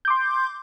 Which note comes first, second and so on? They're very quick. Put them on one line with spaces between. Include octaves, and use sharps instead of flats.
G6 D6 C6